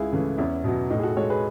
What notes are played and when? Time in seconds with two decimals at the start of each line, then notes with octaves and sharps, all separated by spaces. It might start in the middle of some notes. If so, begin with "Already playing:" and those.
Already playing: C#2 E4 G#4
0.13 C#3 E3 A3
0.38 E2 C#4 E4
0.64 B2 F#3
0.90 A2 D#4
0.99 G#4
1.03 F#4 A4
1.17 G#3 A4 C#5
1.30 G#4 B4